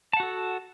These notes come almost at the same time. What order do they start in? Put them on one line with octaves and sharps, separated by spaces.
A5 F#5 F#4 A4